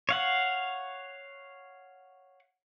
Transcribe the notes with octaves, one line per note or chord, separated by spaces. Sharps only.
C#5 F5 F#5